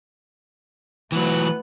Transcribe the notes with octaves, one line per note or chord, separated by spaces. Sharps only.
E3 F#3 A3 B3 F#6